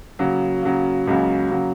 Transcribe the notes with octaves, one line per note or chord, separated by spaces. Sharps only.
C#3 F#3 A#3
C#3 F#3 A#3
C#2 C#3 F#3 A#3
C#3 F#3 A#3